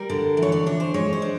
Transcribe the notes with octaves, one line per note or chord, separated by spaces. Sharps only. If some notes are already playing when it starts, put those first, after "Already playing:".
Already playing: G3 A#4
D3
E3
C#5
D5
D4 C#5
C5
G#3 C#5
C5
D4